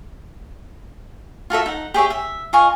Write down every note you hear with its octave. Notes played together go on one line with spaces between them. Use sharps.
F4 F#4 A4 E5
D#4 F#5
G4 G#4 C#5 E5
E5
F4 D#5 G#5 C#6